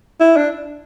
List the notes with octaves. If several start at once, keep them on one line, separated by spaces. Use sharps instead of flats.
E4
D4